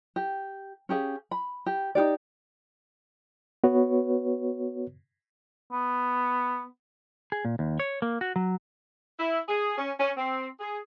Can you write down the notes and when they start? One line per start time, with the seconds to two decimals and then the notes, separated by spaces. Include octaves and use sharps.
0.16 G4
0.89 C#4 G4 G#4 F5
1.31 B5
1.66 G4
1.95 D#4 F4 G4 D5
3.64 B3 F#4 B4 C#5
5.72 B3
7.32 G#4
7.45 A#2
7.59 D#2
7.80 C#5
8.02 A#3
8.21 F#4
8.36 F#3
9.19 E4
9.49 G#4
9.78 C#4
9.99 C#4
10.17 C4
10.60 G#4